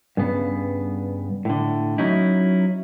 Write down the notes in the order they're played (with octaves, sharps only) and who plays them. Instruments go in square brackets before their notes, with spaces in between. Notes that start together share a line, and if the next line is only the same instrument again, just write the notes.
[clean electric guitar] G2 C#3 B3
A2 D3
F#3 C#4 D#4 E4